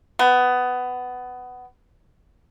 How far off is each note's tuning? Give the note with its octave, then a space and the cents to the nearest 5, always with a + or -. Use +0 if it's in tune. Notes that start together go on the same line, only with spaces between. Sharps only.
B3 +15